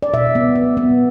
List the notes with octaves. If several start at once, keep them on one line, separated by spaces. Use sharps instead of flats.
D5
B2 E5
B3
B3
B3